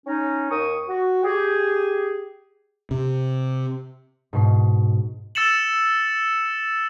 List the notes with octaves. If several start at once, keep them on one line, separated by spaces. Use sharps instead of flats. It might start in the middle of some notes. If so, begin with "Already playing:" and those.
C#4 D#4
D#2 C#6 D#6
F#4
G4 G#4
C3
G#2 B2 C7
E6 A6 C#7 E7 F#7